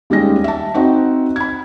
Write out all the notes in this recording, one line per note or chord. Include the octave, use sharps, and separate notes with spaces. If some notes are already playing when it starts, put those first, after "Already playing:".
D#2 G3 G#3 C#4 A#6
E5 A5
C4 D#4 F#4
B5 G#6